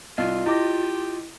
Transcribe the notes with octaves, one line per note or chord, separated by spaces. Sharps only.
C2 F4 D#5 F5
E4 G4 D#5 D6 A#6